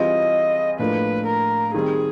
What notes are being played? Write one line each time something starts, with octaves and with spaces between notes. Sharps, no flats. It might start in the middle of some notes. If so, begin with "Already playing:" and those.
Already playing: E3 G3 C4 F4 G#4 D#5
A2 F3 A#3 D4 F4 B4
A#4
D#3 G3 C4 G#4